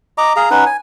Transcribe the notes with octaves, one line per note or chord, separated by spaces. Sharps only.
D#5 A#5 D6
G#4 F5 A#5
C#4 D#4 B4 F#5
G#5